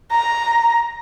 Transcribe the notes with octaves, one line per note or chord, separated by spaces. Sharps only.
A#5